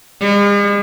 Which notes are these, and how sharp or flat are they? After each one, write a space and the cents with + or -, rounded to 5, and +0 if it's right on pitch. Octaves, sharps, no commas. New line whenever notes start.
G#3 -45